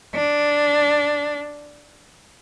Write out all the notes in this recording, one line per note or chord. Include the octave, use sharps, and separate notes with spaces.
D4